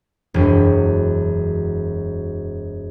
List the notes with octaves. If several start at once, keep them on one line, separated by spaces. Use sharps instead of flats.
E1 F#2